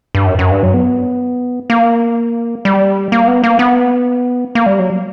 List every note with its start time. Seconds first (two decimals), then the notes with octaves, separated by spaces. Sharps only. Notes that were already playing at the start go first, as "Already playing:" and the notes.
0.15 G2
0.26 F#2
0.39 F#2
0.51 G2
0.63 F#3
0.74 B3
1.70 A#3
2.65 G3
3.12 A#3
3.28 B3
3.44 A#3
3.59 B3
4.55 A#3
4.66 G3
4.79 F#3